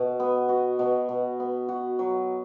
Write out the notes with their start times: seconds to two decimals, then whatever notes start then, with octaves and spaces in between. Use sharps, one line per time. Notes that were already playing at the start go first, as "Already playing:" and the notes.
Already playing: B2
0.20 B3
0.49 F#4
0.79 B2
1.09 B2
1.40 B3
1.69 F#4
1.99 F#3